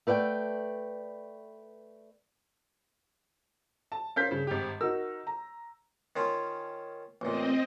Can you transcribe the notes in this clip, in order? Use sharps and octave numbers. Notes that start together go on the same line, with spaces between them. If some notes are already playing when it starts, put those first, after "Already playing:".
A3 B4 D5 F5 G5
A5
C#4 A#4 C5 F5 G6 B6
G2 C#3
G#1 G4
D#4 F#4 A#4 E6
A#5
D#3 C#4 F4
A1 A#2 C4 D#5